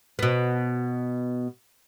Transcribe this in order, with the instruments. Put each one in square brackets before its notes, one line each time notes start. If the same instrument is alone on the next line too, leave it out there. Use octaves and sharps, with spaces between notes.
[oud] B2 B3